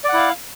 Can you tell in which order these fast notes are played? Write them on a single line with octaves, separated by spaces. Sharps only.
D5 F#5 E4 F5